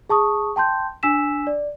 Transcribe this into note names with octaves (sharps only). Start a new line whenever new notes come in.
G#4 A5 C#6 D#6
G5 A5 C6 G6
D4 G#5 E6 B6 E7
D5